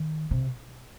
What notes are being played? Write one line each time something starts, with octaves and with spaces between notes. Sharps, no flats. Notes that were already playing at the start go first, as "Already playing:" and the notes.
Already playing: D#3
C3